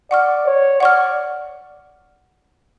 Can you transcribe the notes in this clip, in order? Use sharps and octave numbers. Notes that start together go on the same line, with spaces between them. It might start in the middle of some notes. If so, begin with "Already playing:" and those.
D5 F#5 C#6 F6
C#5
D5 F#5 C#6 F6